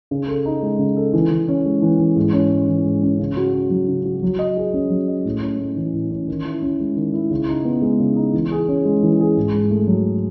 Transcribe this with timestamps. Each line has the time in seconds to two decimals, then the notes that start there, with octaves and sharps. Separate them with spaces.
0.11 C#3
0.28 A4
0.45 D#4
0.62 G#3
0.79 C#3
0.97 A4
1.13 E3
1.30 E3
1.48 C#4
1.65 G#3
1.82 E3
2.00 E3
2.16 G#2
2.33 C#4
2.51 G#3
2.68 E3
2.84 G#2
3.03 C#4
3.19 C#3
3.37 F#4
3.53 C#4
3.70 F#3
3.88 C#3
4.05 F#4
4.22 F#3
4.39 D#5
4.57 G#4
4.73 C#4
4.90 F#3
5.08 D#5
5.25 A2
5.42 C#4
5.60 A3
5.76 E3
5.94 A2
6.10 C#4
6.28 D#3
6.45 E4
6.62 C#4
6.80 G#3
6.96 D#3
7.14 E4
7.30 C#3
7.48 D#4
7.65 B3
7.82 G#3
8.00 C#3
8.16 D#4
8.34 E3
8.51 G#4
8.68 C#4
8.85 G#3
9.03 E3
9.20 G#4
9.37 G#2
9.53 G#2
9.71 A3
9.87 F#3